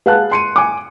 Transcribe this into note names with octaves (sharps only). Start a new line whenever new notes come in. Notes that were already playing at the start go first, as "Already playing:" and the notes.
G#4 B4 F5 F#5 A5 F#6
C6 C#7 D#7
G#5 D6